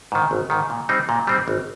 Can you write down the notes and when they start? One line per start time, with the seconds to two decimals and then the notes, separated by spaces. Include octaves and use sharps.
0.12 G#2 D#3
0.31 G#1
0.50 G#2 D#3
0.70 A#2
0.89 G3 C4 D#4
1.09 A#2
1.27 G3 C4 D#4
1.48 G#1